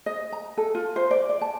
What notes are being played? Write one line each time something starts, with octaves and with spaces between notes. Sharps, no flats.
D#5
A#5
A4
F4
C5
D5
D5
A5